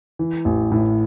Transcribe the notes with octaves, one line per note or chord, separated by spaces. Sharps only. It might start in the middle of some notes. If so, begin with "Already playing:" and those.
E3
A1
A2